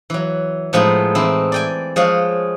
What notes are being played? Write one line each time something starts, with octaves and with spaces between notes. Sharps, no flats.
E3 F#3
A2 F3 G#3 B3 D#4
E3 C4 D#4 E4
D5 G5 G#5
F3 G#3 C#5 D#5 F5 F#5